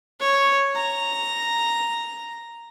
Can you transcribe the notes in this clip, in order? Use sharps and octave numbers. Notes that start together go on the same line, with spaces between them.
C#5
A#5